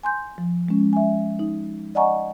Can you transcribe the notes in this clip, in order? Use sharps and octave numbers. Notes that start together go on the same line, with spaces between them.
G#5 C6 G6
F3
G#3 C#4
E5 G#5
D#4
D5 D#5 F#5 G#5 A#5 C#6